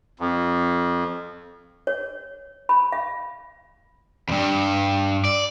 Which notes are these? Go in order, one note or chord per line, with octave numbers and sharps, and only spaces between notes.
F2
C#5
B5
F5
E2 G2
D5